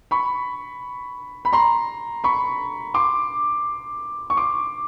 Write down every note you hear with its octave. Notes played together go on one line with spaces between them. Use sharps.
B5 C#6
B5
A#5 C6
B5 C#6
C6 D6
C#6
C6 D6